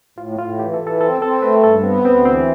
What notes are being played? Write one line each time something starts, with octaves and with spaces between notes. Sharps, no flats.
A2 F4
A2 F4
E3 G4
A4
E3
A4
C4 A4
C4 A4
A3 B4
G2 A4
B3 C4
D2 C4
E3 C4